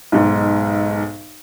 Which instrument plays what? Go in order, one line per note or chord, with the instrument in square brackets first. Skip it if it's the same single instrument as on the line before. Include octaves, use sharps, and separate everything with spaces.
[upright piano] B1 G#2